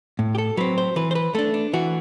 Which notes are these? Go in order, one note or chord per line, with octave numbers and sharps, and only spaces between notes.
A2
G4
A4
F#3 C4 B4
C5
E3 B4
C5
B4
A3 D4 A4
D4
E3 F#4